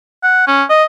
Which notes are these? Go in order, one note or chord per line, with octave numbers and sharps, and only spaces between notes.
F#5
C#4
D#5